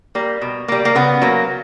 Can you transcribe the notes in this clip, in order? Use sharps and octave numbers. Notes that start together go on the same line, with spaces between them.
G3 A#3
B2
G3 A#3
A#3
C#3 B3
F#3 A#3